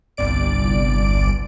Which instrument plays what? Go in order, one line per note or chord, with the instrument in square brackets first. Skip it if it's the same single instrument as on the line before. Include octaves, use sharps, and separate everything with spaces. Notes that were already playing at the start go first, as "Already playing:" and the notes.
[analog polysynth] G1 C2 D5 D7